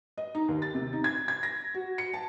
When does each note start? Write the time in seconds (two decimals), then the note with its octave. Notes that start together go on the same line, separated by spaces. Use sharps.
0.18 D#5
0.35 D#4
0.48 D#2
0.62 A6
0.75 C3
0.93 D#4
1.04 G#6
1.28 G#6
1.43 A#6
1.74 F#4
1.98 C#7
2.14 A5